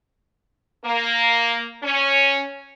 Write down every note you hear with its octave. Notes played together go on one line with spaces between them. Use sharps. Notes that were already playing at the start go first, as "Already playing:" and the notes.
A#3
C#4